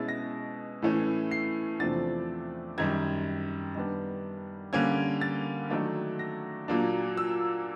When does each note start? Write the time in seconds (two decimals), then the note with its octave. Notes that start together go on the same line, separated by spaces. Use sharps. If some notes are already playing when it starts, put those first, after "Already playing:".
Already playing: B2 G#3 C#4 E4 A6
0.09 A#6
0.82 A2 E3 A3 C#4
1.31 C7
1.80 E2 C3 F3 A3 D4 A6
2.78 F#2 D#3 G3 G#6
3.75 D#3 G3 B3 D4
4.73 D3 G3 A#3 C#4 G#6
5.21 A6
5.70 D#3 F#3 A3 D4
6.19 A#6
6.68 A#2 F#3 A#3 D4
7.17 E6